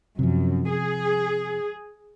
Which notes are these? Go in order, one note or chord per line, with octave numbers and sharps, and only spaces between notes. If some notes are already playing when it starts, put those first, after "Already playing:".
F#2 C3 F3
G#4